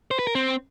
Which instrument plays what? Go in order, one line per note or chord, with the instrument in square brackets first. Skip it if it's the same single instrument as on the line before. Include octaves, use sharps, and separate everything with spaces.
[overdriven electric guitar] C5
B4
A#4
C4